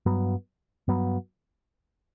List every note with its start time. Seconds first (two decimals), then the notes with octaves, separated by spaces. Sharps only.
0.06 G2 F#3 B3
0.88 G2 F#3 B3